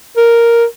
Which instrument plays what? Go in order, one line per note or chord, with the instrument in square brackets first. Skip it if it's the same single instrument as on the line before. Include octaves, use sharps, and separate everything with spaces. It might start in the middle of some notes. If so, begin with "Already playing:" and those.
[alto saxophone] A#4